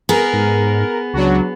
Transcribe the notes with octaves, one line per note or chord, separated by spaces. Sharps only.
B3 G#4 A#4
G#2
C#2 F#3 D4 F#4